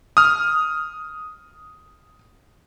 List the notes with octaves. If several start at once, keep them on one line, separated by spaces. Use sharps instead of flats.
D#6 F6